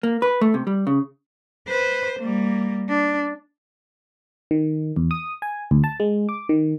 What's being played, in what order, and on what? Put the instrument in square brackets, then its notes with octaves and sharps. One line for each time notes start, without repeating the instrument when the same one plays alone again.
[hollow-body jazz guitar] A#3
B4
A3
C3
G3
C#3
[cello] B4 C5
G3 A#3
D4
[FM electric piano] D#3
E2
D#6
G#5
D2
A5
G#3
D6
D#3